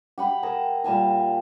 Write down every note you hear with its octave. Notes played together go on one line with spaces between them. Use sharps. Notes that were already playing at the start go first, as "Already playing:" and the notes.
G4 F#5 B5
G#4 A#4 A5
A#2 G3 G#5 A5